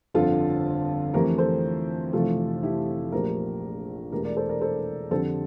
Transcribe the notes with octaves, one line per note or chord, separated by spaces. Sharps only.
G1 F2 D3 F4 A4
F2 E3 A3 G4 A#4
A4 C5
F1 F2 E3 A3 F4 A4
E4 G4
A#1 A#2 F3 A3 G4 A#4
E1 E2 E3 A3 G4 A#4
A#4 D5
A4 C5
A#4 D5
A4 C5
F2 D3 G3 A4 C5